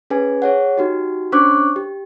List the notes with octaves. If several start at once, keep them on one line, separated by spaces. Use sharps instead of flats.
C#4 G#4 B4 G#5
G#4 C#5 F#5
D#4 F#4 G4
C#4 D4 C5 C#6 D6 F#6
G4